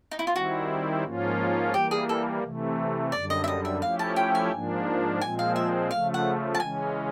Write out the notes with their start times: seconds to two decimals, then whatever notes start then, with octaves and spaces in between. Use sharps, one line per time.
0.11 D#4
0.19 E4
0.27 F4
0.35 D#3 G3 C4 E4 F#4
1.04 G#2 F3 A#3 C#4 F4
1.73 E3 G3 A#3 G4
1.91 G#4
2.09 A4
2.43 C3 E3 A3
3.12 F#2 D3 G3 D5
3.30 D#5
3.44 E5
3.48 D#5
3.65 E5
3.82 F3 A3 C#4 E4 G4 F5
3.99 A5
4.16 G5
4.35 G#5
4.52 G#2 F3 A#3 D4
5.21 A#2 F3 G#3 C4 G#5
5.39 F5
5.56 E5
5.90 C#3 F3 A3 F5
6.14 F#5
6.55 A5
6.60 C#3 E3 G#3 C#4 G#5